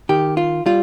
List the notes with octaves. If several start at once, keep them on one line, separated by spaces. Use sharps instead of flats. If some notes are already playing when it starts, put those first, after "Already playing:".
D#3 G4
F4
G3 F4